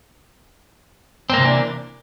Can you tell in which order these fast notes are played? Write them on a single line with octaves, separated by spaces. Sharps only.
C4 A#3 C3 E3 D4